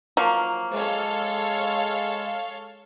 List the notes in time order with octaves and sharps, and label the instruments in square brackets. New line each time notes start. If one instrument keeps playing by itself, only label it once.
[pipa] F3 F#3 A#3
[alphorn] G#3 [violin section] A4 C#5 F5